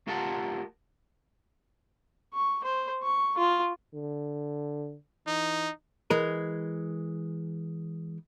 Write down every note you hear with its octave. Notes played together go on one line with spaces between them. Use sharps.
A3 F4 G4 A#4 F#5 A5
C#6
C5
C#6
F4
D3
E3 D#4
E3 G#3 A#4